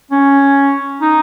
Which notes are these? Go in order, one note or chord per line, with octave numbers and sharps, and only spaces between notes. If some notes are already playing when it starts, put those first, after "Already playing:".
C#4
D#4